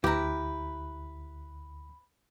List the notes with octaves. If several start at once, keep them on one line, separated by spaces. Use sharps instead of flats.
D2 E4 G4 B4 A#5